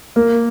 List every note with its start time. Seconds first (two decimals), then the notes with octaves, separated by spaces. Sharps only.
0.16 A#3